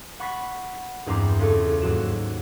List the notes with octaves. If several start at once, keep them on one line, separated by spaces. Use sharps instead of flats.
F#5 B5 C#6 A6 B6 C7
E2 G2 C4 A#5 D6 C7
C#2 A4 C#6
D#2 G#2 F#3 F#4 E7